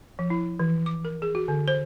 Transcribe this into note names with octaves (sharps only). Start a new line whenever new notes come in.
F3
E4
E3
D6
A#4
G#4
F#4
D3
C5